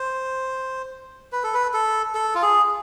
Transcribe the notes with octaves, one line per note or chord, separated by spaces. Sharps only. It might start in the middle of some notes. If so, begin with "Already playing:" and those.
Already playing: C5
B4
A4
B4
A4
A4
F4
G#4